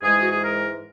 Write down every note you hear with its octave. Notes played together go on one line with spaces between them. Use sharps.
G#2 E3 G#3 G#4
F#4
G#4
A#4